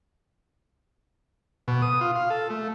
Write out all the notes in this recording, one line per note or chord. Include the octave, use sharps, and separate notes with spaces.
B2
D#6
F4
F5
A4
A3